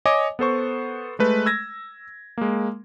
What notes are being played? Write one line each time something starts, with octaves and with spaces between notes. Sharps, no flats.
C#5 D#5 G#5 D6
B3 A4 C5 C#6
G#3 A3 B4
E6 G#6 A#6
G#3 A#3